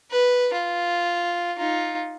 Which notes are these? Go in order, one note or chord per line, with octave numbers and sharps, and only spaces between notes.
B4
F4
D#4 F4